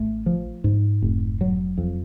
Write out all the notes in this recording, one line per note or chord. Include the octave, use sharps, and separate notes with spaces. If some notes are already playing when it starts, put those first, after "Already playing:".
Already playing: A1 A3
F3
G#2
F1
F#3
F2